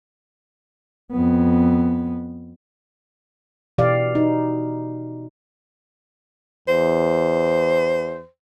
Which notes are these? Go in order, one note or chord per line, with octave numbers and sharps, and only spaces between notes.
F2 B3
B2 E3 G4 D5 F5
D#4
E2 C5